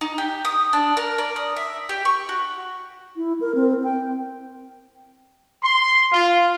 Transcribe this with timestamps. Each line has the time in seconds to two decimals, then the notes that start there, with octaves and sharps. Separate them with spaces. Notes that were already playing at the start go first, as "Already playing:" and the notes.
0.01 D#4
0.18 G4
0.45 D#6
0.73 D4
0.97 A#4
1.18 D5
1.36 D#6
1.56 E5
1.89 G4
2.05 C#6
2.29 F#4
3.16 E4
3.41 A#4
3.55 C4
3.83 G5
5.63 C6
6.11 F4